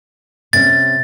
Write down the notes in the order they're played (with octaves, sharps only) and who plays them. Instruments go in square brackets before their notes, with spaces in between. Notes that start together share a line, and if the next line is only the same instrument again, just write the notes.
[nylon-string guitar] C3 C#4 [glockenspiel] A6